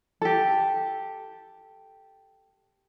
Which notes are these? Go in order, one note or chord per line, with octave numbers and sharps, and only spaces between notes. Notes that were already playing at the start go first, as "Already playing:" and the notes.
G4 A4